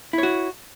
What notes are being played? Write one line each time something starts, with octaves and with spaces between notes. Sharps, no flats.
E4 F#4 C#5